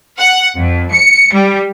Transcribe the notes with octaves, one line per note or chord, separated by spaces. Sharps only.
F#5
F2
C#7
G3